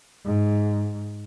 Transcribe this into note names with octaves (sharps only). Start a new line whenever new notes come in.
G#2